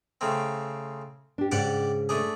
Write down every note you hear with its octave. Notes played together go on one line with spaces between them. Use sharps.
C#3 A3 C4
D4 G4
G#2 C#3 C#4 G4 D5 F#5
A3 D4 G#4